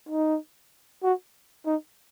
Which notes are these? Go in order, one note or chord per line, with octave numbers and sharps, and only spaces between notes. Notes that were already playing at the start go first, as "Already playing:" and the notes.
D#4
F#4
D#4